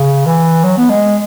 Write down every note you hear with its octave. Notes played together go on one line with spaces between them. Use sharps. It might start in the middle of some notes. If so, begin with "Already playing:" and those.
Already playing: C#3
E3
F#3
B3
G#3